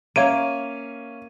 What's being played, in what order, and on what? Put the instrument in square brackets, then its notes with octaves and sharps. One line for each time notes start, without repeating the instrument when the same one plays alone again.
[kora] A#3 [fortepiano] C#4 E5 F5 [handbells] C#5 D7 [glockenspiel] D#7